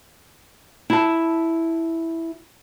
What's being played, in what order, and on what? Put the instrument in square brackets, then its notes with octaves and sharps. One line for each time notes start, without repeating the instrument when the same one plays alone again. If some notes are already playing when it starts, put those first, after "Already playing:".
[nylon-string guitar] E4 A5